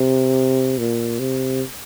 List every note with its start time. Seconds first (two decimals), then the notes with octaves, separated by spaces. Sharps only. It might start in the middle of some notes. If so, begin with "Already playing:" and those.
Already playing: C3
0.78 A#2
1.19 C3